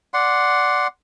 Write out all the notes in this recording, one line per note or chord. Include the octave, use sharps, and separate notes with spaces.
D5 F#5 C6